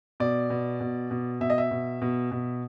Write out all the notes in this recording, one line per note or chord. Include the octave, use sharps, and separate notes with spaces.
B2 D5
B2
B2
B2
B2 E5
D#5
E5
B2
B2
B2